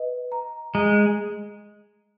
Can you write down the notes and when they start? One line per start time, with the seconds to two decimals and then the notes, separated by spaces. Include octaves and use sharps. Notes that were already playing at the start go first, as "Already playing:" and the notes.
Already playing: B4 D#5
0.32 A#5
0.74 G#3 A#5